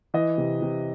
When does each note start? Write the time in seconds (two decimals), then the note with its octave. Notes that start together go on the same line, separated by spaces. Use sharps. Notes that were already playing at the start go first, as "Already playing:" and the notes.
0.14 E3 D#5
0.38 C3
0.62 C3